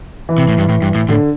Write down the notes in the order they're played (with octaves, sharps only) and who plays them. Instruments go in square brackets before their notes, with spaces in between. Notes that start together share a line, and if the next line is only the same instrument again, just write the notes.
[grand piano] E3
[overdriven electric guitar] C3
A2
G2
A2
G2
A2
[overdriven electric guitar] A2 [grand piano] D3